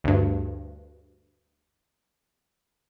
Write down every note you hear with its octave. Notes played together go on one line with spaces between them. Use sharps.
D2 G2